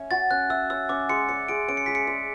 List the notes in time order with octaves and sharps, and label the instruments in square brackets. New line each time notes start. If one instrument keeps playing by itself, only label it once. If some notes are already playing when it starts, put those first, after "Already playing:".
Already playing: [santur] C#4 C#5 E5
[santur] F#4 [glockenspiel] A6
[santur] C#4 [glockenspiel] F#6
[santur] E5 [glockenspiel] E6
[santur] C#5 [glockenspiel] E6
[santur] C#4 [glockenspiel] D6
[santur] G#3 [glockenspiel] C#7
[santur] D5 [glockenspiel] C#7
[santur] G#4 [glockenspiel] D7
[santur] C#4 [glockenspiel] D7
[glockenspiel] C#7
[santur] G#3 [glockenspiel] B6
[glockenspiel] C#7
[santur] D5